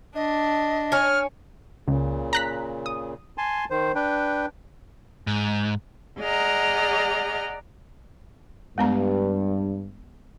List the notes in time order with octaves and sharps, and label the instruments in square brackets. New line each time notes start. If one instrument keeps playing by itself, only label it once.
[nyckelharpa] D4 [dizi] D#5
[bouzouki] C#5 G#5 [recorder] F6
[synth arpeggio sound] C#2 [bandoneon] A#2 C#3
[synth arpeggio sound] A#5 F#6 B6
D#6
[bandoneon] G#5 A5 C6
D#3 C5
D4 B4 G5
[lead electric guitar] G#2
[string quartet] G#4 D5 D#5 F#5 A#5 F6
[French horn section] G2 [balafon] G#3 B3 A#5